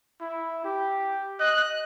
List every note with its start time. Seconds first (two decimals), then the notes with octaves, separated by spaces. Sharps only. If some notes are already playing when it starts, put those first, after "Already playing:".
0.21 E4
0.65 G4
1.40 D#5 F#6